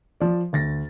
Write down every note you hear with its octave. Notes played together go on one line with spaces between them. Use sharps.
F3 D5
D2 A6 A#6